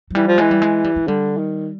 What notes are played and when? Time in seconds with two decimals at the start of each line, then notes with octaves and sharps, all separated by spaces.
0.10 F#3
0.15 E3 G3
0.28 F3
0.38 E3 G#3
0.51 G3
0.62 G#3
0.84 G3
0.96 G#3
1.07 D3 G3
1.37 D#3